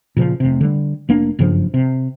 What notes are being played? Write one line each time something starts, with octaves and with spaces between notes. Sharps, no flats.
A#2 C#3 F3
F1 C3
D3 G3
F1 A#3 D4
F#1 G2 C#3 F3
C3